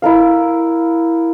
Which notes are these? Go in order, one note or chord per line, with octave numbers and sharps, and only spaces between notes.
E4 A#4 F5